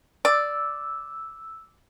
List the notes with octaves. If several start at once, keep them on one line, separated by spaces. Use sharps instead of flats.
D5 E6